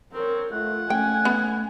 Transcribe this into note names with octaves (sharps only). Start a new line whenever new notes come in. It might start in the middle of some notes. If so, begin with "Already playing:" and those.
C4 A#4 C#5
A3 F4 F#5
A3 C#4 G5 G#5
B3